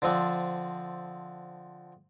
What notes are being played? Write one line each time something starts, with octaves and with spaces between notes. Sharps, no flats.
D3 F3 C4 D4